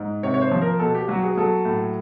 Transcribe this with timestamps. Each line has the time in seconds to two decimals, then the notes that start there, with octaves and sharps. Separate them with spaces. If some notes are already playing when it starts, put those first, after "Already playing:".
Already playing: G#2
0.23 C3 C#5
0.34 C#5
0.42 C5
0.52 F3
0.61 A#4
0.79 B2 A4
0.94 G4
1.08 F#3 F#4
1.23 G#4
1.37 F#3 A4
1.65 A2